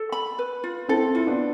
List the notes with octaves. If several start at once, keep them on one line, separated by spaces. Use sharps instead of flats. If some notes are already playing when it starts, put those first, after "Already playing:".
Already playing: A4
B5
B4
F4
C4 E4 A4
E4 F4
B3 D4